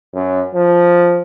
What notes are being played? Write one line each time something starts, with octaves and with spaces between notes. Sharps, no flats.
F#2
F3